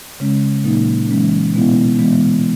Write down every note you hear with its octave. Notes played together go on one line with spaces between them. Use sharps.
C#3 G#3 C#4
A#2 F#3 A#3 D#4
E3 G#3 C#4
B2 G#3 B3 E4
E3 G#3 B3